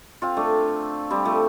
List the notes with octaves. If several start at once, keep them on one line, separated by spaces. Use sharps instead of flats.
C4 F4
A3 D4
G3 C4
F3 A3